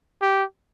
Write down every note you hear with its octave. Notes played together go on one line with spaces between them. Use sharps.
G4